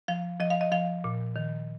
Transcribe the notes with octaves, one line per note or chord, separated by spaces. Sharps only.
F3 F5
F3 D#5
F5
D#5
F3 F5
A#2
D#3